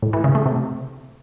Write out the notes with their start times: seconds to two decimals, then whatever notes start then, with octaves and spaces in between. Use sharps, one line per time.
0.02 A2
0.13 E3
0.24 C#3
0.35 A3
0.46 C3